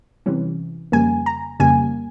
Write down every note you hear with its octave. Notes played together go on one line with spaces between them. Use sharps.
C3 E3 G3 C#4
F2 C#3 G3 A#3 G#5
A#5
F2 C#3 G3 A#3 G#5